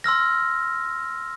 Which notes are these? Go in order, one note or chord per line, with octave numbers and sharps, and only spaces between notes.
C6 E6 F6 A#6